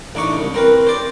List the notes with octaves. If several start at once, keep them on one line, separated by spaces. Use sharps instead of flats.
A1 D4 D#4 C#6
C2
C4 A#4 B4
C5 D5